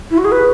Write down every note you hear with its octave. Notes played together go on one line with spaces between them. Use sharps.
E4
F#4
G#4
B4